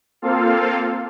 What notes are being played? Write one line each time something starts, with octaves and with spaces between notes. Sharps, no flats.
A#3 C4 F4 A4 F5